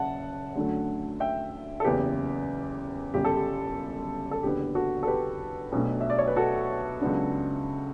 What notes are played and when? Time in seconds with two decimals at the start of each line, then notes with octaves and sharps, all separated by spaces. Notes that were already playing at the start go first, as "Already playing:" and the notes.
Already playing: F#1 C#3 E5 F#5 A5
0.56 D2 D3 F#3 A3 C#4
1.20 E5 G5
1.80 A4
1.84 F#1 E2 C#3 G4 B4
3.14 G1 F#2 C#3 G4
3.25 A4
3.36 G4
4.31 A4
4.43 F#1 E2 D3 F#3 B3 G4
4.75 F#4 A4
5.03 A4
5.07 G4 B4
5.72 B1 B2 F#3 A3 D4
6.01 E5
6.10 D5
6.18 C#5
6.27 B4
6.36 F#4 A4
7.01 C#2 C#3 F#3 B3 D4